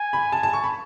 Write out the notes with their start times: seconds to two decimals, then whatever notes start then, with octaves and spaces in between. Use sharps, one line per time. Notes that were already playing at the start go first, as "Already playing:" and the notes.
Already playing: G#5
0.13 B5
0.32 A5
0.43 A5
0.53 C#6
0.64 B5